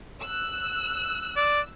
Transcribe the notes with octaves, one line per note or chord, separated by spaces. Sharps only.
E6 F#6
D5